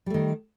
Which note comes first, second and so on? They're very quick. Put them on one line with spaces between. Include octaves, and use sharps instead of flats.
G3 A3 D#3